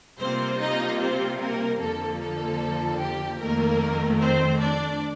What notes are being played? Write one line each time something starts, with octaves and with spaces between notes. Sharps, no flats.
C3 G3 A#3 C4 F4 C5
D#4 D#5
C4 C5
A#3 A#4
F2 D3 F3 A#3 A4
A4
G4
F2 D#3 A3 A#3 A#4
C4 C5
D4 D5